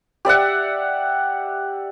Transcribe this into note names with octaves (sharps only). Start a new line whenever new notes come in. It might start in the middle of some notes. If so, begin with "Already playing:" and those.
G4 D5 E5 F#5